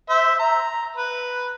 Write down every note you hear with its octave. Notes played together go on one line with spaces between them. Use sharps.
C5 E5
A#5
B4